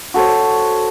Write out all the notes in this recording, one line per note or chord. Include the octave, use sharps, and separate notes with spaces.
F#4 A4 C5 C#5